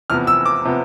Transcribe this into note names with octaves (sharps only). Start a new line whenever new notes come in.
E2 C3 F3 B3 F6
E6
D6
C3 F3 B3